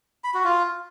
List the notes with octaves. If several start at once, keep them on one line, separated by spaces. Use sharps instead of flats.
B5
F#4
F4